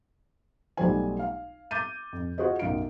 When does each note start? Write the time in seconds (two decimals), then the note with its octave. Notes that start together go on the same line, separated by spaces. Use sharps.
0.77 B1 F#3 G3 A3 C5 G#5
1.19 F5
1.71 D6 G6 A6 D#7
2.13 F2
2.38 F4 F#4 G#4 C5 D#5
2.59 B1 F#2 F5 D7